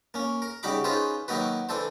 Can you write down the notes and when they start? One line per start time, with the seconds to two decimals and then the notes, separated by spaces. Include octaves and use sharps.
0.14 A#3 C#4
0.42 A#4
0.63 C#3 G3 D#4 F#4 B5 D6
0.84 C#4 D#4 F4 G#4 B4 C5
1.28 D#3 F#3 A#3 D#4 F#4 B4
1.69 E3 D4 A4 C5